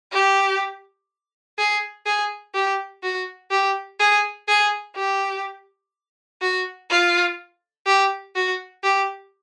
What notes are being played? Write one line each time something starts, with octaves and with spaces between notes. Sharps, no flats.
G4
G#4
G#4
G4
F#4
G4
G#4
G#4
G4
F#4
F4
G4
F#4
G4